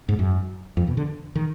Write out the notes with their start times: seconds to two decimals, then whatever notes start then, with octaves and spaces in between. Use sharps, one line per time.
0.09 G#2
0.19 F#2
0.77 F2
0.87 B2
0.97 D3
1.35 D#3